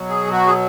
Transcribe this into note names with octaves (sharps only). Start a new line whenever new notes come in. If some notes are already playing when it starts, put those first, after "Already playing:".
Already playing: B2 F#3
G#4
F#4
G#4